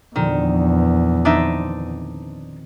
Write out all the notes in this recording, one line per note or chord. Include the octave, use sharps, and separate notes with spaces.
E2 A#2 D3 D#3 F3
D#3 B3 C4 D4 D#4 E5